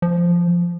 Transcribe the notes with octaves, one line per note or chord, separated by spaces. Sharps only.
F3